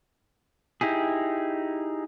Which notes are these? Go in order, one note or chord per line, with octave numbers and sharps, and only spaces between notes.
D#4 E4 G4 G#4